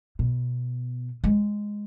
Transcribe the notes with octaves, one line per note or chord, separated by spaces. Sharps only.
B2
G#3